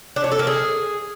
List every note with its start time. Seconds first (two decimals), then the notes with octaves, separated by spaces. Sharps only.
0.16 D4
0.24 C#5
0.32 A4
0.39 A#3
0.47 G#4